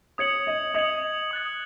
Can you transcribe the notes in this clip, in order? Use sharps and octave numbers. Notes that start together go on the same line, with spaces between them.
C#5 D#6 G#6 C#7 F#7
D#5
D#5 D#6 G#6 C#7 F#7
D#6 F#6 A6